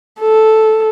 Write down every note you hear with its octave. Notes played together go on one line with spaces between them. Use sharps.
A4